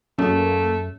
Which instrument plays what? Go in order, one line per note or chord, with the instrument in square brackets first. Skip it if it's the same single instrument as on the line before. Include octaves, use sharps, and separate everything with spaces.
[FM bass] F#2 [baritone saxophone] A3 [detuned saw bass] A#3 [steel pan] C#4